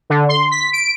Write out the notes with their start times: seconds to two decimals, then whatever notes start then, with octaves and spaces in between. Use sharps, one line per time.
0.10 D3
0.29 C6
0.51 B6
0.73 D7